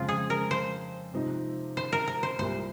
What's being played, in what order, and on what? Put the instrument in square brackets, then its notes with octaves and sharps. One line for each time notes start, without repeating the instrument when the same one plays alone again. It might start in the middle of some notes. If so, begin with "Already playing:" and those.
Already playing: [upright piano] F2 C#3 G#3 C4 [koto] F4
[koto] G#4
A#4
C5
[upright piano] C3 F3 C4 D#4
[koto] C5
A#4
A#4
C5
[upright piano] C2 A#2 G3 [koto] C5